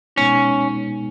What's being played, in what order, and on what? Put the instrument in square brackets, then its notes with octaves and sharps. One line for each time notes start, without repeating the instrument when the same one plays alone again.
[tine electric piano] B2 G#3 B3 D#4 [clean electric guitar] C#4